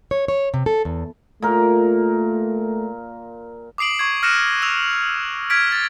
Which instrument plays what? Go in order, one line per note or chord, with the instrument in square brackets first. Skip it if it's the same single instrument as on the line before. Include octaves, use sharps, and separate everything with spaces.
[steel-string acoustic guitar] C#5
C#5
C3
A4
E2
[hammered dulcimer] A#2 A#4 [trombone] A3
[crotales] D6 D#6 C7 D7 F#7
C#6 G#6
F6 F#6 A#6 C#7 D#7 E7
E6 F7
F6 G#6 B6 D7
A6